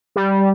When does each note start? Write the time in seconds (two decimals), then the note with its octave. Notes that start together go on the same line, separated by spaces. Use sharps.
0.16 G3